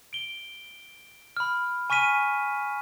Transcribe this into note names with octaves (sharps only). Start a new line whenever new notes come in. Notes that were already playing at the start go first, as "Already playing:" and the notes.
D7 G7
B5 F6
G#5 C#6 F6 B6 D#7